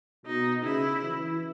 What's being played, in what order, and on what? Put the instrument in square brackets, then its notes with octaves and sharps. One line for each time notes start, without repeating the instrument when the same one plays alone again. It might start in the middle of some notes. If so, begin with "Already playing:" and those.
[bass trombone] B2 [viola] D#4
[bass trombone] C#3 [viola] E4
[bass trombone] E3